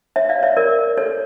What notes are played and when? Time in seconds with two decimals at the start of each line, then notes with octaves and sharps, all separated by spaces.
0.16 C#5 E5
0.29 D5 F5
0.43 C#5 E5
0.57 A#4 D5
0.97 A4 C#5